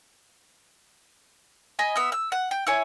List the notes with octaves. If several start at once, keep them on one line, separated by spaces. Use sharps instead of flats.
D#5 G#5 B5
B3 E5
E6
F#5
G5
E4 C#5 G#5